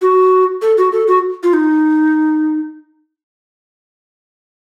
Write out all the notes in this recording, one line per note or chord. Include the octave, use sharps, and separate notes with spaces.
F#4
A4
F#4
A4
F#4
F4
D#4